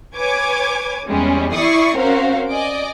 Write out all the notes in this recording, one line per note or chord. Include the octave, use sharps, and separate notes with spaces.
B4 C#5 G#5 D6 G#6
E2 G3 G#3 C#4
E4 D5 C#6 D#6 C7
C4 C#4 F#4 A#4 C5 F5
D5 D#5 G#5 D6